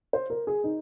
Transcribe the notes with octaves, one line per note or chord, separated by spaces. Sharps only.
C5
A#4
G#4
D#4